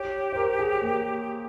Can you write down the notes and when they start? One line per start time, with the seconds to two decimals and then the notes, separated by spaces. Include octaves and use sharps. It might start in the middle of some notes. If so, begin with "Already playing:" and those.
Already playing: G4 C#5
0.32 C5
0.36 A#4
0.59 G#4
0.81 A#3